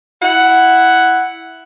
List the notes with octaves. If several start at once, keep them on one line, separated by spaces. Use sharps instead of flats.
E4 F#5